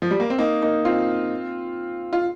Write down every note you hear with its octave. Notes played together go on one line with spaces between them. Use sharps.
F3
G3
A#3
C4
A#3 D#4
A#3 D#4
C4 F4
F4